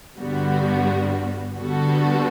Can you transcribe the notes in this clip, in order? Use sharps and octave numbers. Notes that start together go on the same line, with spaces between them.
G2 D3 G3 B3 F#4
D3 G3 B3 F#4 A4